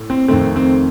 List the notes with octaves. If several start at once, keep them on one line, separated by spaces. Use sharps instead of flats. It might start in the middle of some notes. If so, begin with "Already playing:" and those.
Already playing: A2
C4
F2 D#3 A3 C4
C4